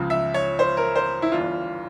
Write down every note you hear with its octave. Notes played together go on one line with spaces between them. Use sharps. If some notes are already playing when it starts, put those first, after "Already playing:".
Already playing: C#2 C#3 F3
E5
C#5
C5
A#4
C5
E4
G1 G2 E3 F4